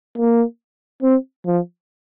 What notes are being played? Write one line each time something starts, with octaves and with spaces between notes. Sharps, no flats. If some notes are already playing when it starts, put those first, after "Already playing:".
A#3
C4
F3